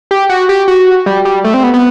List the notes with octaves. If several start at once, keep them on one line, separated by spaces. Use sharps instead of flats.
G4
F#4
G4
F#4
G3
G3
A3
C4
B3
B3